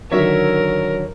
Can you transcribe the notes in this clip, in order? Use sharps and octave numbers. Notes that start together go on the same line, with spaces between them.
D3 D#3 F#3 A#4 C#5 E5